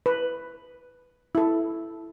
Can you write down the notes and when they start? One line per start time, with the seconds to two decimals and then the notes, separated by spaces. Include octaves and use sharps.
0.06 B4
1.35 E4 A4